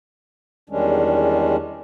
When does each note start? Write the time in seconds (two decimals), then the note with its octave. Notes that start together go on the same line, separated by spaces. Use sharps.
0.70 E2 D#3 G3 G#3 C#4 D4